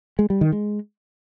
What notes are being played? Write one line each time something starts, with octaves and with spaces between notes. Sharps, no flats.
G#3
G3
D#3
G#3